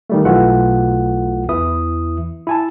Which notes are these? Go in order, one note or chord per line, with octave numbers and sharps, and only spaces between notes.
D#3 G3 A3
B1 B2 E3 A3 F4 F#5
E2 E3 E4 E5 D#6
E4 G#5 A5